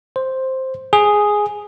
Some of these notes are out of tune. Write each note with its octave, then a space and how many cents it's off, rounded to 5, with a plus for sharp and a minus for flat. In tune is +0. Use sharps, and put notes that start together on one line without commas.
C5 +5
G#4 +0